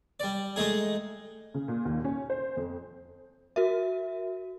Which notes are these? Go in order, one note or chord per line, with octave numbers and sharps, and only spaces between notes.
G3 D5
G#3 A3 D#4 G#4
C#3
A#2
D#2
C#4
C5
F2
F#4 A#4 E5